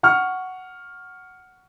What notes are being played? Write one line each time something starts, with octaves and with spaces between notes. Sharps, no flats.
F#5 C#6 F6